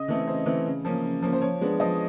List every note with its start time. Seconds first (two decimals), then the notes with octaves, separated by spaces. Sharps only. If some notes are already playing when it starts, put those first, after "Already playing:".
Already playing: C#3 D#5
0.08 E3 A3 C4
0.27 C#3 C5
0.46 E3 A3 C4
0.66 C#3
0.85 F3 A#3 C#4
1.04 C#3
1.22 F3 A#3 C#4
1.33 C5
1.41 F3 C#5
1.61 G#3 B3 D4
1.80 F3 D#5